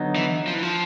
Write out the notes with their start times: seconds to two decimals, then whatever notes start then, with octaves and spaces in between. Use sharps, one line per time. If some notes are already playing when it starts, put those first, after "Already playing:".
Already playing: D3 F#3 B3 D#4
0.16 E3
0.47 F3
0.55 E3
0.63 F3